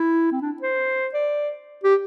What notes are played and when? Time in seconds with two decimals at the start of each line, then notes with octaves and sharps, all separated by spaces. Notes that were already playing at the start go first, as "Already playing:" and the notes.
Already playing: E4
0.32 C4
0.42 D4
0.62 C5
1.14 D5
1.84 G4